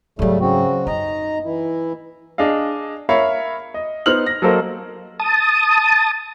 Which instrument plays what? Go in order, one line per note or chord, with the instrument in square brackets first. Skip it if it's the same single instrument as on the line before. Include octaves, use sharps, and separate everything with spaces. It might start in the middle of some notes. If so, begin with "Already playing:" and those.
[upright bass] G#2 F#3 [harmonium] C#3 G3 A3
[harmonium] C#3 C4 F#4
[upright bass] F#2 [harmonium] D#4 D#5 A#5
[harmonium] E3 E4
[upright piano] D4 G#4 D#5 F5
A#4 C#5 E5 F5 B5
D#5
B3 D#4 C5 F6 F#7
A#6
F#3 A#3 A4 A#4 C5 D#5
[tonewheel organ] A5 D#6